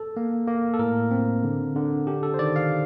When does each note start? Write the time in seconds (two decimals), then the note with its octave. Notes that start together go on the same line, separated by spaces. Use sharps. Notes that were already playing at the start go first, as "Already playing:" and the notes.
Already playing: A4
0.17 A#3
0.48 A#3
0.74 A4
0.79 A2 A#4
1.11 C4
1.44 D3
1.76 D3
2.07 D4 G4
2.23 A4
2.34 C5
2.39 D#3 D5
2.56 F5